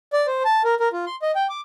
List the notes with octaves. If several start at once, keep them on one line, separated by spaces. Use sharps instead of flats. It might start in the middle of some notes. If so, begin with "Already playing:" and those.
D5
C5
A5
A#4
A#4
F4
C6
D#5
G5
D6